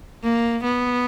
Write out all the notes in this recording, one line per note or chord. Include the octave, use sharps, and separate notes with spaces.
A#3
B3